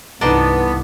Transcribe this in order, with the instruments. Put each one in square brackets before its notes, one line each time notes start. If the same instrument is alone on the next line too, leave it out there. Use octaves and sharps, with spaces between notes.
[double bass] C2 G2 [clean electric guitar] E3 A4 [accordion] B3 [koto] D4 D#4 C5